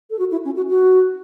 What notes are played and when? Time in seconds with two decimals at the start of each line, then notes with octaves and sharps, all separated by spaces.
0.10 A4
0.19 F#4
0.31 E4
0.45 C#4
0.56 F#4
0.69 F#4